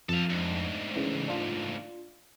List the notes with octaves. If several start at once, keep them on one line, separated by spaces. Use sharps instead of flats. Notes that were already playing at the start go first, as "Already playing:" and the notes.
F2 A4 F5
D2 G#2
C#3 E3
D4 F4